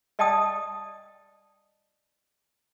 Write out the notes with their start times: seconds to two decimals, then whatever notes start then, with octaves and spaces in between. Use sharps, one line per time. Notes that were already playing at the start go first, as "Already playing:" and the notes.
0.19 D5 D#5 G5 A5 A#5 D#6